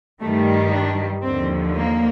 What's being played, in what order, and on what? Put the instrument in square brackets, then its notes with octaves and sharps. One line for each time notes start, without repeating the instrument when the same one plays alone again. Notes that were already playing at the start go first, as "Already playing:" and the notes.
[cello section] G2 D#3 G3 A3
D4
D#2 D3 F3 C4
A#3